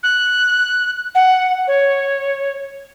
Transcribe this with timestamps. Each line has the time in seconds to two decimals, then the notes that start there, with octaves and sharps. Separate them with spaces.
0.03 F#6
1.15 F#5
1.67 C#5